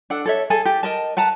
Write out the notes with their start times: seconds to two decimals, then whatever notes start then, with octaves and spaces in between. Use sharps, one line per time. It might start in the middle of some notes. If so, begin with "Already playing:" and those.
0.10 D4 A4 F#5
0.26 A4 C#5 E5
0.50 G#4 A4 G#5
0.65 G4
0.83 A#4 D#5 A5
1.17 B4 F#5 A5 A#5